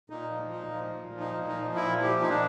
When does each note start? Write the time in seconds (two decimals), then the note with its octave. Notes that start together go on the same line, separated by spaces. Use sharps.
0.10 A#2 D#4
0.30 F3
0.51 A#2 D#4
0.71 F3
0.93 A#2
1.13 F3
1.20 D#4
1.34 A#2
1.48 D#4
1.54 F3
1.75 A#2 E4
1.96 F3
2.02 G4
2.16 A#2
2.21 D#4
2.30 D4